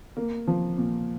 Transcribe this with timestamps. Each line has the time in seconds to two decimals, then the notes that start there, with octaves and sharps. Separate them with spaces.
0.17 A#3
0.47 F3
0.78 A#2